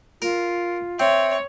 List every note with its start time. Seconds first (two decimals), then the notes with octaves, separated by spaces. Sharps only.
0.22 F4 A#4
1.00 C4 C#5 E5